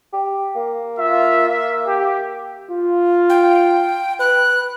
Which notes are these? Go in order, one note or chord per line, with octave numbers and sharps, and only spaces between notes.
G4
A#3
F4 E5
E5
G4
F4
G5
B4 F#6